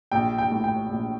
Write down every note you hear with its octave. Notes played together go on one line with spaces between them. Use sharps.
A#1 G5
G5
A2
G5
A#1